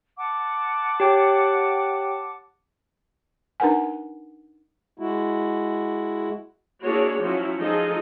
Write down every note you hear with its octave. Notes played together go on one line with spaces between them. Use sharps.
F#5 A5 D6
G4 C#5 G5
D4 D#4 A#4 B4 F#5 G#5
G#3 E4 F#4
A#3 D4 E4 F#4 G#4 C#5
F3 F#3 C#4 E4 F#4
F3 D#4 F4 G#4 A4 D#5